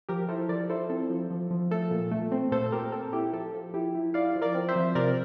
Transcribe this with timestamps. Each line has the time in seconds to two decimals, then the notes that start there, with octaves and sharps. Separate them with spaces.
0.09 F3 G4 A#4
0.28 E4 A4 C5
0.49 F3 A#4 D5
0.69 E4 A4 C5
0.90 C4 A4
1.10 F3
1.31 F3
1.51 F3
1.71 A3 A4
1.91 A#2
2.11 A3
2.32 C4
2.52 A#2 A4 C5
2.66 A4
2.72 C4 G4 A#4
2.92 C4 A4
3.13 E4 G4
3.33 F3 A4
3.54 F3
3.74 E4 G4
3.95 E4
4.14 E4 D5 F5
4.36 F3
4.42 A#4 D5
4.55 C4
4.69 C5 E5
4.76 F3
4.95 C3 A#4 D5